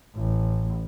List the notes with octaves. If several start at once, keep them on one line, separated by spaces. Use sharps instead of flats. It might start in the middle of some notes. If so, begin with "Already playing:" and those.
A1